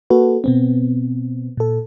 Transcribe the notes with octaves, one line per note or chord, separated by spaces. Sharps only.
A#3 F#4 A4 B4
B2 B3 C4
A#2 A4